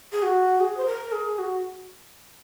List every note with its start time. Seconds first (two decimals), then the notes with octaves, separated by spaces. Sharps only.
0.12 G#4
0.22 F#4
0.60 G#4
0.77 C5
0.86 A#4
1.12 G#4
1.38 F#4